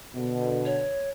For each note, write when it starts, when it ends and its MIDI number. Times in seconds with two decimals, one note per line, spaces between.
0.14 0.88 47
0.14 0.88 50
0.66 1.10 73